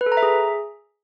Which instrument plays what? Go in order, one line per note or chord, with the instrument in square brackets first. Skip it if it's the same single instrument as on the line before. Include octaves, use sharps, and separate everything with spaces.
[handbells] B4
A4
A#5
E5
G#4